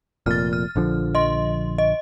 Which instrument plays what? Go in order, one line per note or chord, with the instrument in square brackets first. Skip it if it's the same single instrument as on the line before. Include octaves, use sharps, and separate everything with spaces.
[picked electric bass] F1 F2 A#2 [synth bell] F6 A6
[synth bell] F6
[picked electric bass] A#1 D3 F3
[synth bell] D#5 C6
D#5